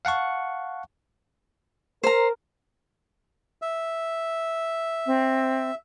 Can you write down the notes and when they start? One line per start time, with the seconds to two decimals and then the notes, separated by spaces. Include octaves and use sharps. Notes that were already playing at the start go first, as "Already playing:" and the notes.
0.05 F5 F#5 A5 C#6
2.03 A#4 C5 A#5
3.62 E5
5.06 C4